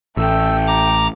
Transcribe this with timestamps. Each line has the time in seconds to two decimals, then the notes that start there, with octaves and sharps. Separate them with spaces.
0.17 A1 A3 G5 E6
0.67 A#5 D6